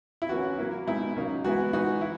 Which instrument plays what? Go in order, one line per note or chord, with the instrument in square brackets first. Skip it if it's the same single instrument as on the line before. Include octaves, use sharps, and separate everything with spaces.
[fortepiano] E4
E3 A#3 C#4 F#4
F#3 A#3 E4
B2 G#3 D#4 E4
C#3 F#3 A#3 D#4
E3 G#3 B3 E4 F#4
E3 G#3 D#4 F#4
E4